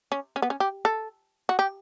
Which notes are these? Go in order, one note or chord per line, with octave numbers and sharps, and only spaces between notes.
C#4
C#4
B3
C#4
G4
A4
F#4
G4